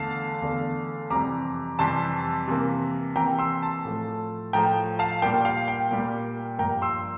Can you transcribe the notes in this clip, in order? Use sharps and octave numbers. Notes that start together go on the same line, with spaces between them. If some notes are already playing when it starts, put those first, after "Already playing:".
Already playing: E2 D3 A3 F5 A5
E2 D3 A3
F2 C3 E3 G3 A#5 D6
F2 C3 E3 G3 A5 C6
C3 E3 A#3
C3 E3 A#3 G5 A#5
C6 E6
A5 C6
A2 F3 A3
A2 F3 A3 G5 A#5
F5 A5
A#2 G3 A#3 G5
F5
G5
A#2 G3 A#3
G2 F3 A#3 G5 A#5
C6 E6